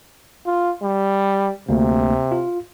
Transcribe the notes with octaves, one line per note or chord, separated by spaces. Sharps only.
F4
G3
D2 C3 A#3
F4